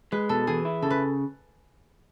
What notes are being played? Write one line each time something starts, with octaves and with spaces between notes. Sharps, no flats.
G#3 B4
B2 A4
E3 G#4
E4
C#3 A4
B4